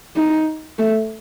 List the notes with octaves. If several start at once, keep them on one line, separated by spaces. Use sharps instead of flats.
D#4
A3